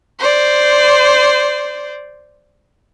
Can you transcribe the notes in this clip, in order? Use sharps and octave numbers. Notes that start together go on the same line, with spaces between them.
C5 D5